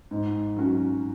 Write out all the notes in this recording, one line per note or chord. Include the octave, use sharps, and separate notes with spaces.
G#2
F#3 C#4 F#4